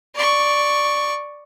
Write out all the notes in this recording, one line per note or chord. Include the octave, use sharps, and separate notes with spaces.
D5 C#6